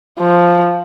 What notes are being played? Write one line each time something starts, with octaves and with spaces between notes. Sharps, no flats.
F3